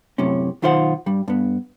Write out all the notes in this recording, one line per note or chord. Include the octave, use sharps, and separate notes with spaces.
F#2 A2 C3 C#4
B1 D#3 F4 C5 D5 F#5
G2 G3
G2 B3